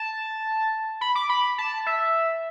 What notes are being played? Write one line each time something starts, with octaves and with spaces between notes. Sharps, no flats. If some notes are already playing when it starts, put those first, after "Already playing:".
Already playing: A5
B5
D6
B5
A5
E5